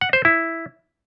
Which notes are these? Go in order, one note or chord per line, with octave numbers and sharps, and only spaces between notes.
F#5
C5
E4